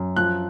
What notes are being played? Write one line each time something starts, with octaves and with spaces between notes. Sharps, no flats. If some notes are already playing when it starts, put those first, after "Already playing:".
Already playing: F#2
F3 F#6